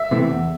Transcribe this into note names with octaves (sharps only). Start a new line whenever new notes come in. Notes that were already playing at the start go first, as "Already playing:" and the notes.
Already playing: E5
C3 E3 A3 C4
E2